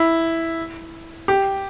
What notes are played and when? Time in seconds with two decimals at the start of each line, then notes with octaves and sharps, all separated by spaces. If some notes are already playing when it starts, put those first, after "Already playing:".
Already playing: E4
1.28 G4